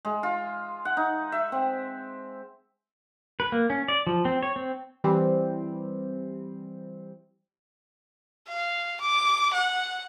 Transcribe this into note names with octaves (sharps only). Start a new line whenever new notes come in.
G#3
F4
F#5
D#4
E5
C4
B4
A#3
C#4
D5
F3
C4
C#5
C4
E3 G3 C4
F5
D6
F#5